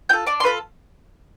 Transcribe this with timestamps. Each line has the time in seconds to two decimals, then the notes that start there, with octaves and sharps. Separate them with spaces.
0.09 F4 A4 G5 G6
0.26 D4 D5 D6
0.40 C6
0.43 F4 A4 B4 B5